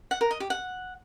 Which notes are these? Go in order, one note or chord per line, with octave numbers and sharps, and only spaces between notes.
F#5
A#4
D#5
G4
F#5